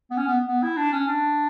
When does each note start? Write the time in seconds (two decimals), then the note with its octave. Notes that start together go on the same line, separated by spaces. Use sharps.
0.11 B3
0.17 C#4
0.27 B3
0.47 B3
0.63 E4
0.77 D4
0.92 C#4
1.07 D4